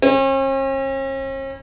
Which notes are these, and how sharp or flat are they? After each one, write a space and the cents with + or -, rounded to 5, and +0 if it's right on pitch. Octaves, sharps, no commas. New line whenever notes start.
C#4 -45